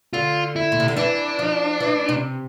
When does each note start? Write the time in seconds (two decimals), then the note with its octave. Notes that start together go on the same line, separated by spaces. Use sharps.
0.13 D3 F4
0.56 E4
0.72 A#2
0.80 C3
0.88 D3
0.97 E3 D4
1.39 F3
1.80 E3
2.09 C3